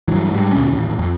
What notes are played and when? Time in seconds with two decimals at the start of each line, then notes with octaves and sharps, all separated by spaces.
0.08 G2 E3 F#3
0.32 G#2 G3
0.53 D#2 B2 C#4
0.70 D#1 A1
0.99 F2